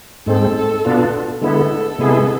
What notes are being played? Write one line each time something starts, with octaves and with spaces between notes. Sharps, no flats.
G#2 G#3 C4 A4
B2 B3 D4 F4
D3 G#3 B3 E4 A4
C3 G#3 B3 E4 G#4